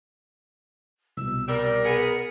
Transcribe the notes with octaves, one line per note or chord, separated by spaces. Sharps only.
C2 B2 E6
G3 A#4
B3 G#4